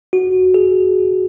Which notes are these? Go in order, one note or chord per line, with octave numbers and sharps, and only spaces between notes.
F#4
G#4